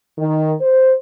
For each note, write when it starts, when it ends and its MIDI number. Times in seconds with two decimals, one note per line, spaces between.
0.18 0.54 51
0.61 0.94 72